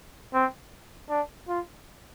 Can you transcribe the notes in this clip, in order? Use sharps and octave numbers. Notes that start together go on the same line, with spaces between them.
C4
D4
F4